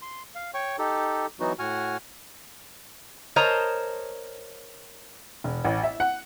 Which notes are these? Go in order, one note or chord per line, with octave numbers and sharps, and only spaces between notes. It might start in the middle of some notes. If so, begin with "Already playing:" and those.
C6
F5
C#5 G5 C#6
D#4 G4 A4
E3 F#3 B3 D#4 F#4
A2 F#4 F#5 G#5 F6
A#4 C5 C#5 D#5 A5 A#5
E1
A1
E5
F#5